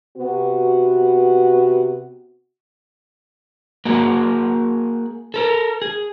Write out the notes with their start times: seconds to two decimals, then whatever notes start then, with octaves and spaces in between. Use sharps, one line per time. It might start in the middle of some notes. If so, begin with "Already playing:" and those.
0.17 C3 B3 F#4
3.85 A#3 F#4 G#4
5.34 A4 A#4
5.82 G#4